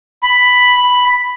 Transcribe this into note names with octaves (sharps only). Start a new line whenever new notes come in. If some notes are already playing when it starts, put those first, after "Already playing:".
B5